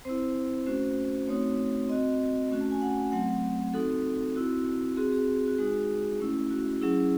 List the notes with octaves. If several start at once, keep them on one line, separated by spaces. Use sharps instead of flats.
C4 E4 C5
A3 C#4 F#4 C5
A3 C4 D#4 F#4 C#5
C4 F#4 D#5
A3 C#4 F#4
A5
G#5
F#5
F#3 A3 C4 F#5
C4 D#4 F#4 A4
C4 E4 F#4
C4 F#4 G#4
G#4
F#4
G#3 D#4 F#4 G#4
A3 C#4 E4
F#4
F#3 C#4 E4 G#4